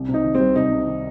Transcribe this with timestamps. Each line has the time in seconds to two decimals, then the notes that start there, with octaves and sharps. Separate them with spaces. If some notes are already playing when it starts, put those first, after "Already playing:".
Already playing: C2
0.08 C3
0.14 D#4
0.24 D#3
0.35 G3 C4
0.56 C2 D#4
0.71 C3
0.87 D#3